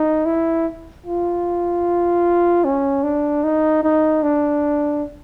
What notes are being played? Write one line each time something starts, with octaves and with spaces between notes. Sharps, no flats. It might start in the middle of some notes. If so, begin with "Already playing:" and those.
Already playing: D#4
E4
F4
C#4
D4
D#4
D#4
D4